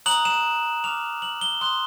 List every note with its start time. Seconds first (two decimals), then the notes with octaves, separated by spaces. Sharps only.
0.06 A#5 D#6 F#6 F#7
0.25 E7
0.83 A#5 D6 F6 F7
1.22 F#7
1.41 G7
1.61 C6 D#6 F#6 G7